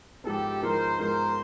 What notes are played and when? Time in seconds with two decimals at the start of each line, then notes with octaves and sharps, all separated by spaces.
0.24 G#2 F3 G#3 B3 G4 A4
0.61 G#2 F3 G#3 B3 A#4 C5
0.98 G#2 F3 G#3 B3 A#4 C5